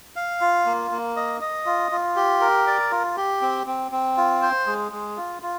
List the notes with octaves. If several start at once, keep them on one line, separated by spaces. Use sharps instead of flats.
F5
F4
A#3
A#3
D#5
D#5
F4
F4
G4
A#4
D5
F4
G4
C4
C4
C4
F4
C5
G#3
G#3
F4
F4